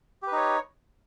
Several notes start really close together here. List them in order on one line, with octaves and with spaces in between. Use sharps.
G4 B4 D#4 C#5